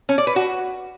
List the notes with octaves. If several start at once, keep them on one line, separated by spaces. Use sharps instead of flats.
C#4
D5
B4
F#4